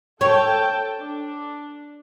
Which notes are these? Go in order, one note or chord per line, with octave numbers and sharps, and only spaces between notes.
A4 C#5 G5 A5
D4